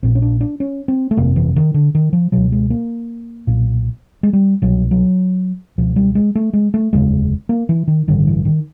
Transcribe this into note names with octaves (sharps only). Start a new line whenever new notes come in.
A#1 A#2 C4
C#4
D4
D4
C#4
C4
A3
G1 F2 C3 A#3
E3
D#3
D3
D#3
F3
C#2 B2 F#3
G#3
A#3
B1 A#2
G#3
G3
C2 B2 F#3
F#3
C#2 B2 F3
G3
G#3
A3
G#3
A3
F1 D#2 C#3 G#3
A#3
E3
D#3
A1 G2 D3 D#3
E3
D#3